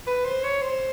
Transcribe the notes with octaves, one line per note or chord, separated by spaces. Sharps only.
B4
C5
C#5
C5